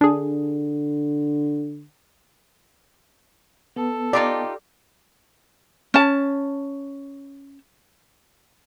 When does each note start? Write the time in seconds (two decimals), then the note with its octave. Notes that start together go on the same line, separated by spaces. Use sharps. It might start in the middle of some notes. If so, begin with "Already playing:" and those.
0.01 D3 D4 G#4
3.76 B3 A4
4.13 D#4 F4 G4 D5
5.94 C#4 A5